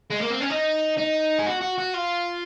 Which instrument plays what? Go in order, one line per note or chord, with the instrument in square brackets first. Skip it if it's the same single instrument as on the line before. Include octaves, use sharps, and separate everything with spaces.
[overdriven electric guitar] G#3
A#3
C4
C#4
D#4
D#4
G#4
F#4
F#4
F#4
F4